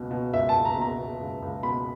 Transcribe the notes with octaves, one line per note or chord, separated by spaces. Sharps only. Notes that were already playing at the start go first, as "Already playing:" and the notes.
Already playing: C#2 B2
B2
C#2 E5
A5
C#2
A#5
B2 A#5
B2
C#2
C#2
B2 B5